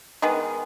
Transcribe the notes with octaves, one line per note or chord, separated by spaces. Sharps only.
D#3 G#3 B3